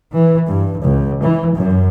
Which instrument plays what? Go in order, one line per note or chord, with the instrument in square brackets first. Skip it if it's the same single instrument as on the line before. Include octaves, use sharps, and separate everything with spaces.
[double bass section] E3
G2
C#2
E3
F#2